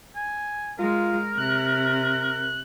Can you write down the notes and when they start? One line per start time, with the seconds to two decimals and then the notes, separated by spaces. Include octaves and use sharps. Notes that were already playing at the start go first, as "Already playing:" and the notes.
0.16 G#5
0.79 G#3 F4 A#4
1.38 C3 F#6